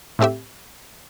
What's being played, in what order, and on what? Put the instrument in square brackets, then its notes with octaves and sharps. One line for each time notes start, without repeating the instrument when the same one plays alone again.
[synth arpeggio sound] A2 A3 C4 G4 E5